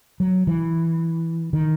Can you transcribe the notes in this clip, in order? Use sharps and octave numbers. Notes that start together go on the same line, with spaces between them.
F#3
E3
D#3